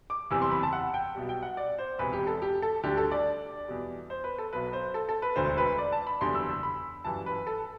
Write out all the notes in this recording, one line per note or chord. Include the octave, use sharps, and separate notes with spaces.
D6
F#1 E2 C3 E3 G3 E6
C6
B5
A5
F#5
G5
B1 B2 G3
G5
F#5
D5
C5
E1 E2 C3 E3 B4
G4
A4
G4
A4
D2 D3 G3 G4
A4
D5
E2 B2 G3
C5
B4
A4
B1 B2 F#3 B4
C5
A4
A4
B4
E1 D2 D3 C5
B4
D5
A5
B5
F#1 E2 D3 G3 C6
E6
B5
G1 F#2 E3 G3 A5
B4
A4